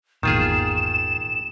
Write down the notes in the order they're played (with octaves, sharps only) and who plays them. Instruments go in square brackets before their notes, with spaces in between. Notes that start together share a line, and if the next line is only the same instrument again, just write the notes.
[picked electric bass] G#1 E2 A#2 [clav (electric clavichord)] D#3 F4 G#4 [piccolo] E7